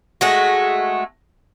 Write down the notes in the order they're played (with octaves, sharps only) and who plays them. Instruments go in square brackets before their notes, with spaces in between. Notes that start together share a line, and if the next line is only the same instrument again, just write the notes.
[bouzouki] G#3 A3 F#4